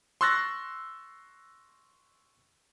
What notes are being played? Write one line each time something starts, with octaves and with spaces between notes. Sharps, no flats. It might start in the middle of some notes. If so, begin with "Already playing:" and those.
C6 C#6 E6 F#6 A6 A#6